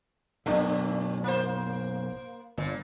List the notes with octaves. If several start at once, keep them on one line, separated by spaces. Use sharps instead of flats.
B1 F#2 A2 A3 D4
A#3 C5
G1 A#2